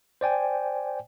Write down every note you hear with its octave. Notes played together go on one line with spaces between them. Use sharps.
C5 D5 G5 G#5